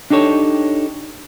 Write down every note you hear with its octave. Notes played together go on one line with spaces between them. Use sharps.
D4 D#4 G4 A4 C#5